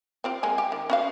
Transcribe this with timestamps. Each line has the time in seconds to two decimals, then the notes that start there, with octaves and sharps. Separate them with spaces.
0.24 C4 F4 G4
0.43 G#3 A#3 G#5
0.58 G4
0.72 D#3
0.90 C#4 F#4 F5